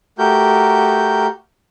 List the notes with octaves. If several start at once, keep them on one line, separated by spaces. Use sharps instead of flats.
A3 F#4 G4 A#4 G6